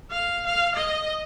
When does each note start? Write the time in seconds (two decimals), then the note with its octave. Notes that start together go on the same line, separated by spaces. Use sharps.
0.11 F5
0.47 F5
0.76 D#5